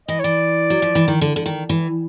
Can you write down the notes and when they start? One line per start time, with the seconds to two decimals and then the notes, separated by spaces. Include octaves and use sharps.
0.08 E3 D#5
0.19 C#5
0.24 E3 D5
0.70 F#3
0.82 F3
0.95 E3
1.08 D#3
1.21 D3
1.36 D3
1.46 D#3
1.69 E3